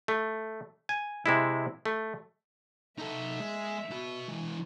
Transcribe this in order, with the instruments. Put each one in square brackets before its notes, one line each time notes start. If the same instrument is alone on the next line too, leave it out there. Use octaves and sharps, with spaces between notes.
[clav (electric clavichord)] A3
G#5
C3 G#3 E4
A3
[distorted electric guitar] D#4 A4 [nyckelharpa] E5
[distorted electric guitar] G#3
F#4 B5
E3 G#3